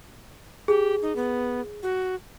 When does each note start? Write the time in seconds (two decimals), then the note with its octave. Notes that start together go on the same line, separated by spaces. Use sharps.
0.68 G4 G#4
1.02 D#4
1.16 B3
1.83 F#4